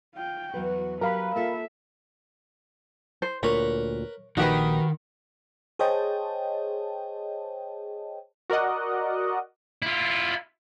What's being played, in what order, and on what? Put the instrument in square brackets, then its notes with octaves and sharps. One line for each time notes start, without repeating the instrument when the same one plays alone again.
[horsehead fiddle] F4 G5
[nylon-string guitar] E2 F#3 B4 [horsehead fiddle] F#4
[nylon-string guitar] F#3 G4 [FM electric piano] A#4 F5 B5 [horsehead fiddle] B4
[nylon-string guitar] A#3 F4 A4 [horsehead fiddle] E5
[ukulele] C5
[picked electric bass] D2 A#2 [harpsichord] A#4 B4 [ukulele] C#5
[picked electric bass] A#1 [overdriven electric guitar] D#3 [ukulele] F#4 G4 B4 [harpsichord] A#4 D#5
[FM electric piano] G#4 C5 C#5 D#5 G5 A5
[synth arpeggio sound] F#4 A#4 D5 D#5 F#5
[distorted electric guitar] E4 F4